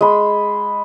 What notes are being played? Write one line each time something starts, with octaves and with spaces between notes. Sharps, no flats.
G#3 B5